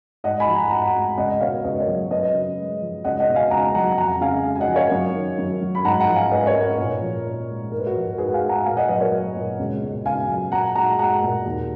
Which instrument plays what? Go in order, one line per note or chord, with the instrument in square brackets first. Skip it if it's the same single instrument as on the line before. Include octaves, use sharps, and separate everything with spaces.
[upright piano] G#2 D#5 F#5
G#5 B5
F3
F#5 A#5
G#2 F#5 A#5
F#5 A#5
G#3
C#2 D#5 F#5
B2 C#5 F5
C#2 B4 D#5
A#4 C#5
F#3
F#2 B4 D#5
C#3
G#3
F3
C#2 D#5 F#5
D#5 F#5
B2
F5 G#5
C#2 F#5 A#5
F#3 F#5 A#5
F2 F#5 A#5
C#3 F5 G#5
G#3
G#5
D#5 F#5
F3
C#5 F5
F#2
D#3
F#2
F#3
B5
G#2 F#5 A#5
F#5 A#5
F3
F5 G#5
G#2 B4 D#5
A#4 C#5
G#3
A#4 C#5
A#2
F3
A#2
G#3
G#2 A#4
B4
F#4 A#4
F3
A#4
G#2 G#4 B4
F#5
F5 G#5
G#3
F#5 A#5
A#2 F5 G#5
D#5 F#5
F#3 B4 D#5
A#4 C#5
F#3
A#2
C#2
B2
C#2 F5 G#5
F#3
A#2 F#5 A#5
G#3 F#5 A#5
G#3 F#5 A#5
A#2
D#2